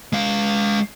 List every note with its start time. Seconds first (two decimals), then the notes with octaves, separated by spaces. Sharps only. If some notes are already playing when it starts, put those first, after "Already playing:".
0.13 G#3 F5